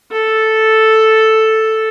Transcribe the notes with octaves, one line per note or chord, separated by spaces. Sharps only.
A4